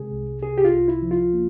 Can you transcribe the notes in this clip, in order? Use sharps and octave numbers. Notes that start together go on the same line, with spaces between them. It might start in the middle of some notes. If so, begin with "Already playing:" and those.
Already playing: C3 G#3 G#4
C2
C3 G#4
G4
F4
C2
E4
F3
F4
A#3